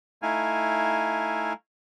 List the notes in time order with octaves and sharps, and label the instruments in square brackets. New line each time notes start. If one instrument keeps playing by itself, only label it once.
[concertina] A3 D#4 E4 F5 G#5